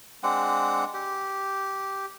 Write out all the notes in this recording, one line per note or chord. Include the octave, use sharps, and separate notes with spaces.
G#3 C4 D4 F#5
G4